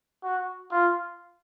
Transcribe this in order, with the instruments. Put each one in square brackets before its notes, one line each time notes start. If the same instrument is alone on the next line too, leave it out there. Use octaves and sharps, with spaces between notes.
[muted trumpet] F#4
F4